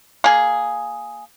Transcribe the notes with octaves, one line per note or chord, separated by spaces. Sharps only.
A#3 G#4